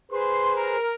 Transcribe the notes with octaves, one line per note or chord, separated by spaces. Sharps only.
G#4 B4 C5 C6
A#4